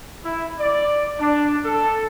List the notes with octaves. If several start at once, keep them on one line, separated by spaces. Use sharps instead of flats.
E4
D5
D4
A4